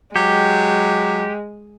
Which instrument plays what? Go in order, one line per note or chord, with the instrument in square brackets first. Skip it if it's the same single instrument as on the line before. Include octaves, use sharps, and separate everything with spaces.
[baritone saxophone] F#3 [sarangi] G#3 [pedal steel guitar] G4